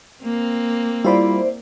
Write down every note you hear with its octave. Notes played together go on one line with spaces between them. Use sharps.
A#3 C4
G3 E4 F4 C5 D5 B5